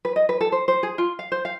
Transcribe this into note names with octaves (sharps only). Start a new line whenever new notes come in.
B4
D#5
B4
A4
C5
C5
G#4
F4
F5
C5
F5